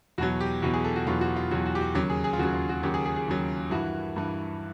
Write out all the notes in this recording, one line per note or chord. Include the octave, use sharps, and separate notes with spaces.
E2 B2 F#3 F#4
G4
E2 B2 F#3 F#4
G#4
A4
F#4
E2 B2 F#3 F4
F#4
F4
E2 B2 F#3 F#4
F#4
G4
F#4
D#2 C#3 F#3 G4
G#4
G#4
F4
D#2 C#3 F#3 F#4
F4
F#4
D#2 C#3 F#3 G4
G#4
G#4
G#4
D#2 C#3 F#3
G2 E3 F#4
G2 E3